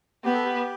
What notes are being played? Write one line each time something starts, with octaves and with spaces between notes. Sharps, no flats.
B3 G4
A4
G4